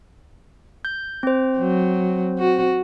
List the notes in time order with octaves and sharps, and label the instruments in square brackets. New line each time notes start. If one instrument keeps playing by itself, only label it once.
[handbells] G6
C4 C5
[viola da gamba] F#3
F#4